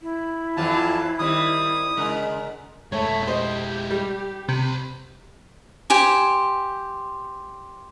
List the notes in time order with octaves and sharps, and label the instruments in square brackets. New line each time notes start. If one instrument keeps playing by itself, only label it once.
[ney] E4
[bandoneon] F2 A5 [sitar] E3 F#3 F4
[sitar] D#3 G3 C4 [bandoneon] D#6
[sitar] C#3 G#3 A#4
[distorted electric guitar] G#3 E4 [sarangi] A3 [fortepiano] C#5
[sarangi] G4 [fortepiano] C5 D#5
[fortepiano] G3
[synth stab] C3 [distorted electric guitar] C5 B5
[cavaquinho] G4 C5 G#5